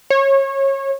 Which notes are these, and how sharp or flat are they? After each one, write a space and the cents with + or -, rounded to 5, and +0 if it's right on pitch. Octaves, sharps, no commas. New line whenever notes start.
C#5 -25